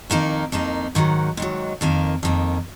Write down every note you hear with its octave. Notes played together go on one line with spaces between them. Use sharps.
F2 D#3 A#3 D#4
F2 D#3 A#3 D#4
G#2 D#3 F#3
G#2 D#3 F#3
F2 D#3 A#3
F2 D#3 A#3